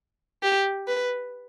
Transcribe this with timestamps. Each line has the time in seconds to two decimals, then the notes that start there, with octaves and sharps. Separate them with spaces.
0.43 G4
0.88 B4